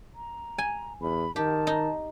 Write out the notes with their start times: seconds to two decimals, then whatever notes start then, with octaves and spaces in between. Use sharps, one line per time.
0.15 A#5
0.58 G#5
1.01 E2 B5
1.36 D#3 G4 A5
1.67 D#4